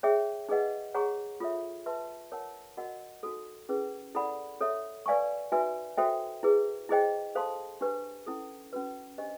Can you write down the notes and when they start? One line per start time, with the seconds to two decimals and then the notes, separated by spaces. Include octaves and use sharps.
0.03 G#4 C#5 E5 G5
0.49 D#4 G#4 B4 D#5 F#5
0.94 G#4 C#5 F#5 A#5 C#6
1.40 F4 A4 C#5 E5
1.86 B4 E5 A5 C6
2.32 A#4 C#5 F#5 A5
2.77 F#4 A#4 D#5 F#5
3.23 D#4 F#4 A4
3.69 C#4 E4 G#4 B4
4.15 E4 A4 D5 F#5 B5
4.61 A4 C#5 E5
5.06 B4 D5 F5 G#5 C#6
5.52 D#4 F#4 B4 E5 G#5
5.97 F#4 A4 C5 E5 G5
6.43 E4 G#4 B4
6.89 E4 G#4 C5 D#5 G5
7.35 A4 C5 F5 A5 C6
7.81 D4 G4 B4
8.27 C#4 E4 A4
8.73 C#4 F#4 B4
9.18 D4 G4 C5 D#5